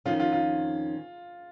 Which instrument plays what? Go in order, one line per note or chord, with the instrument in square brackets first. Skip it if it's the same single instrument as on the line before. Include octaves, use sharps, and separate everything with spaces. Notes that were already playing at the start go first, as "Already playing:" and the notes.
[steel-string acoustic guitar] F2 D#3 C#4 [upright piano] F4
[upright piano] F4
F4